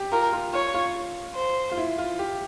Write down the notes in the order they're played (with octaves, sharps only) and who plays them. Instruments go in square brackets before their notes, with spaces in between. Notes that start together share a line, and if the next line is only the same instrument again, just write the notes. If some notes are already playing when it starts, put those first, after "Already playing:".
Already playing: [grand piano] G4
[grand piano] F4 [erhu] A#4
[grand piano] F4
[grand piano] F4 [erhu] C#5
[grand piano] F4
[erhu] C5
[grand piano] F4
E4
F4
G4